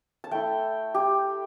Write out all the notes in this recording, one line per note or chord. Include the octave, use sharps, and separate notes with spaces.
A5
A3 E4 G5
G4